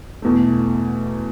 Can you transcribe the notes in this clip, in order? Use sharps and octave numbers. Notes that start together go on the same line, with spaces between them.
E2 B2 A3